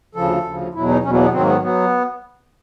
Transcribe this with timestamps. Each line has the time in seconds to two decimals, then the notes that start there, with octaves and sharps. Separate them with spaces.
0.15 D2 C#3 F3 A4
0.44 D2 C#3 F3
0.74 E2 B2 F#3 E4
0.88 D#4
1.03 E2 B2 F#3 C#4
1.13 A#3
1.23 B3
1.32 G#2 D#3 F#3 C4
1.41 A#3
1.47 B3
1.62 F#3 B3